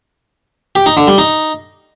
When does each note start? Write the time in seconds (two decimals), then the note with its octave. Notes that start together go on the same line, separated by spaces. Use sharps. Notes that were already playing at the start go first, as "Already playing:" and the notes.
0.75 G4
0.86 D#4
0.97 D3
1.08 G3
1.18 D#4